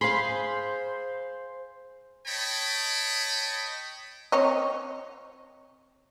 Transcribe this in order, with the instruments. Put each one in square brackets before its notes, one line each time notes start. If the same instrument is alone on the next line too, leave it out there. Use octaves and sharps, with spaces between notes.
[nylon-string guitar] G#4 F5 [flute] C5 [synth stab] B5 C6 C7
[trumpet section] C#5 D#5 G5 A5 B5
[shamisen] C4 C#5 D#5